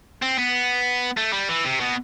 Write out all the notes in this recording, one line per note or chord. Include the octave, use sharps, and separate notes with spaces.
C4
B3
A3
G3
E3
C3
B2